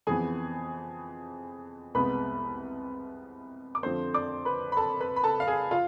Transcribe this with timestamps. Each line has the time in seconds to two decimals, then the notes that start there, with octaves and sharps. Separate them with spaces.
0.07 F2 E3 B3 G#4 G#5
1.95 C2 C3 G#3 B3 B4 B5
3.75 D6
3.83 F2 D3 F3 A3 C4 C5 C6
4.14 D5 D6
4.45 B4 B5
4.72 B5
4.77 A4 A5
5.01 B4 B5
5.16 B5
5.24 A4 A5
5.40 F5
5.47 G#4 G#5
5.71 F4 F5